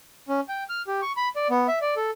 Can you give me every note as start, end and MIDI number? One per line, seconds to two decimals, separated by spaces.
0.29 0.41 61
0.49 0.64 79
0.69 0.82 89
0.87 1.01 67
1.02 1.12 85
1.17 1.29 83
1.36 1.48 74
1.50 1.67 59
1.68 1.79 76
1.81 1.94 74
1.97 2.11 69